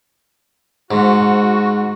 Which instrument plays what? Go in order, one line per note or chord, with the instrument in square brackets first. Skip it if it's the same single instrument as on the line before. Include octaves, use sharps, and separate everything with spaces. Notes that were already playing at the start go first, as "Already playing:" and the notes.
[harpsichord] G#2 [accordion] F#4